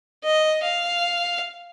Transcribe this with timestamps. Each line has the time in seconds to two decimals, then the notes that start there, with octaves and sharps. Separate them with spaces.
0.24 D#5
0.63 F5